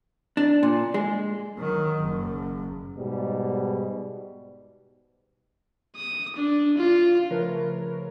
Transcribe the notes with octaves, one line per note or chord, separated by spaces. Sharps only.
D4
A#2
G#3
D#3 F#3
F#1 F#2
G#2 B2 G3
D#6
D4
F4
C#3 F3 A3 A#4 B4 C#5